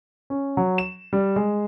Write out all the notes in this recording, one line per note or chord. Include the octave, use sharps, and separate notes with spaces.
C#4
F#3
E7
G3
G#3